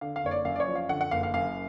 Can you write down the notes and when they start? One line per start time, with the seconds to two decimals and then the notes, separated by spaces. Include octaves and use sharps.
0.01 D3 F5
0.16 F5
0.23 F#1 C#5
0.31 D5
0.45 F#2 F5
0.56 D5
0.60 C#5
0.68 F3
0.75 F5
0.89 D3 F#5
1.01 F#5
1.11 F#1 F5
1.23 F5
1.34 F#2 F5